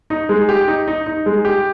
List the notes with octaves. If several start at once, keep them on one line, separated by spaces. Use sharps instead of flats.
D#4
G#3
G4
D#4
D#4
D#4
G#3
G4